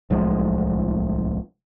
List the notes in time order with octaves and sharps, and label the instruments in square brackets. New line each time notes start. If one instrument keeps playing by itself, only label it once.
[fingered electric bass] D1 C2 F3 G#3